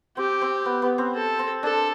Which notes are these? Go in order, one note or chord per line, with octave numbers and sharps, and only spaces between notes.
C4 G4
C4
B3
B3
C4
A4
C4
D4 A4